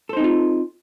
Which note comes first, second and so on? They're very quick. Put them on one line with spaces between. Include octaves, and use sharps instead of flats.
A4 C5 D#4 C4 F4